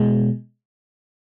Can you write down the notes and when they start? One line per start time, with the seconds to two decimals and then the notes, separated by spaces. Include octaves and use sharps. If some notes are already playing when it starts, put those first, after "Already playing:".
Already playing: B2 G#3